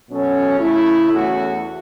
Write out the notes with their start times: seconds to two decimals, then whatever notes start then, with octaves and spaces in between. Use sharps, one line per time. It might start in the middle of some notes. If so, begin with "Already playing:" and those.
0.09 B2 F#3 C#4 A4
0.59 C#3 A3 E4
1.11 E2 E3 A3 C#4 F#4